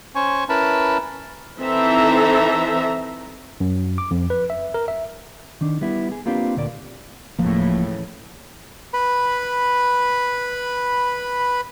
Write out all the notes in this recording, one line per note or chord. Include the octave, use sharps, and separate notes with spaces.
C#4 C5 G#5 C#6
C#4 E4 A#4 B4 A5 B5
E3 C4 D#4 A4 E5 A#5
F#2
D6
F2
B4
E5
A#4
E5
D#3 D4
G3 B3 E4
G#4
A#3 C4 D4 F4 G4 B4
D2 A#2 A#3 D5
D1 A2 C#3 E3 F3 A#3
B4 B5